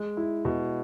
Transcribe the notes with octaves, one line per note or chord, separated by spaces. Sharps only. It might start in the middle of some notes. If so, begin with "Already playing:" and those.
Already playing: G#3
E4
B2